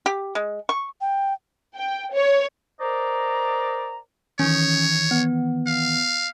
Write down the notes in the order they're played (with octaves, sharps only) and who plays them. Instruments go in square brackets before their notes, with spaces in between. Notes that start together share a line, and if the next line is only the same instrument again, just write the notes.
[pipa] G4
G#3
C#6
[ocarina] G5
[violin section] G5
C#5
[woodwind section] A#4 C5 D5 D#5 A#5
[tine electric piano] D#3 E3 [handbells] C#4 [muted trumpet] C#5
[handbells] B3
[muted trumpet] F5